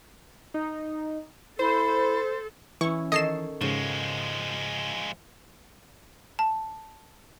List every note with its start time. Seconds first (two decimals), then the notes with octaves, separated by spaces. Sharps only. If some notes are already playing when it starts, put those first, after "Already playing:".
0.54 D#4
1.59 E4 A4 C5
2.81 E3 C#4 E4 C#6
3.12 D#3 A4 C#5 D#5 C7 E7
3.61 G#2 C#3 F3 G#3 F#4
6.39 A5